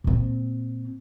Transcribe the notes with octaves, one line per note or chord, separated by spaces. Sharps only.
A#2 C4